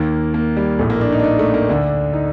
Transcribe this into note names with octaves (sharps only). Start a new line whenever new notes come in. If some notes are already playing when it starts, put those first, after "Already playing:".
Already playing: D#2 D#3 A#3
A#3
G3
A#1 A2 A3
A#3
D4
D#4
D4
D#4
A3
A#3
D2 D3 D4
D#4